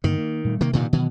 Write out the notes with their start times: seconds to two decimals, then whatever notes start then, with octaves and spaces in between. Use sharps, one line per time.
0.04 G2 D3 D#3 A#3
0.17 A#3
0.45 A#2 G3 A3
0.61 C3 D#3 A#3
0.73 G2 A#2 D#3
0.93 B2 D#3 E3 F#3